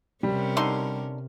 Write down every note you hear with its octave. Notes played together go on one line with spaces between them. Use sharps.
C3 G3 C#4 A#4
D3 D#4 C6